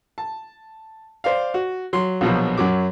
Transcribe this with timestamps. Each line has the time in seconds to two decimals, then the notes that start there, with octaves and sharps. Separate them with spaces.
0.18 A5
1.24 C5 D5 F5
1.54 F#4
1.93 F#3 C6
2.21 A#1 B2 F3 F#3
2.58 F#2 F#3 D6